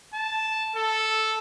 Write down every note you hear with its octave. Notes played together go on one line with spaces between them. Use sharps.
A5
A4